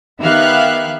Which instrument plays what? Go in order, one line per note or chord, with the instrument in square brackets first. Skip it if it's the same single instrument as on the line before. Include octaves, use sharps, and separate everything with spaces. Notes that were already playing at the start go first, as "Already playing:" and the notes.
[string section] D#3 B3 G4 E5 F5 F#6